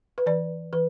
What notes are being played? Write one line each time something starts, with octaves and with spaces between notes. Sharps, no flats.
B4
E3 D5
E3 B4